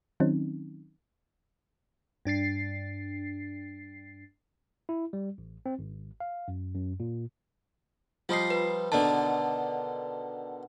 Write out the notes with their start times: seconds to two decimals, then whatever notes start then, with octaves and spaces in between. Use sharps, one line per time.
0.20 D#3 F#3 C4 C#4 D#4
2.25 G2 D4 A6 C7
4.89 E4
5.13 G3
5.38 A1
5.66 C4
5.79 G#1
6.20 F5
6.48 F#2
6.75 F#2
7.00 A#2
8.29 F3 G3 D#4 F4 C7
8.50 B4
8.92 B2 D3 D#3 D5 A5